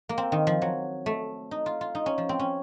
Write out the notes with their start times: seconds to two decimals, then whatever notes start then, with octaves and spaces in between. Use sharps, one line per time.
0.09 A#3
0.18 C4
0.32 D#3
0.47 F3
0.62 F#3
1.06 A3
1.51 D#4
1.66 F4
1.81 F4
1.95 D#4
2.06 C#4
2.18 F3
2.29 C4
2.39 C#4